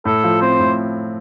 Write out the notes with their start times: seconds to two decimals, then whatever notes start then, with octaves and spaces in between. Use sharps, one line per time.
0.05 A2 A4
0.24 F3
0.41 C4 C5
0.60 A2